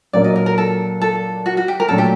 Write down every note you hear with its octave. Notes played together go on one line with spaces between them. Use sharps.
A#2 F#3 A#3 D4 D5
D#5
A#4
A#4
A4
A4
F#4
F#4
G4
A#4
A#2 F#3 A3 D4 A4
G4